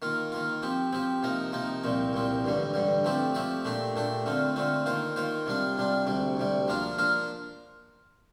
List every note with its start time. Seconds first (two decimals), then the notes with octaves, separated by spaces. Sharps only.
0.02 D#3 A#3 F4
0.32 D#3 A#3 F4
0.63 F3 C4 G4
0.93 F3 C4 G4
1.23 C3 F3 A#3 D#4
1.53 C3 F3 A#3 D#4
1.84 C2 A#2 F3 C4
2.13 C2 A#2 F3 C4
2.44 A1 G2 D3 G3
2.74 A1 G2 D3 G3
3.04 F3 A3 C4 G4 D5
3.35 F3 A3 C4 G4 D5
3.65 A#2 A3 D4 G4
3.96 A#2 A3 D4 G4
4.26 D3 A3 C4 F4
4.56 D3 A3 C4 F4
4.86 D#3 A#3 F4 C5
5.16 D#3 A#3 F4 C5
5.46 C3 G3 D4 F4
5.78 C3 G3 D4 F4
6.07 D2 C3 G3
6.37 D2 C3 G3
6.68 F3 A#3 D4 F4 A#4
6.98 F3 A#3 D4 F4 A#4